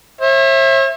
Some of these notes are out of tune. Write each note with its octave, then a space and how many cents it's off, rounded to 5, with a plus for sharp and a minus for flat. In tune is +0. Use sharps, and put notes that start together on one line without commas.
C#5 -45 E5 +0